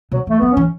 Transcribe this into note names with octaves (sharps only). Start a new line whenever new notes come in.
B2 F#3
E3 A3
F#3 B3
C#4
E3